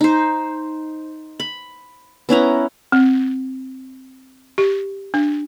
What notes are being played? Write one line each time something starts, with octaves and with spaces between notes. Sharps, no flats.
D#4 C5
B5
B3 C#4 E4 A#5
C4
G4
D4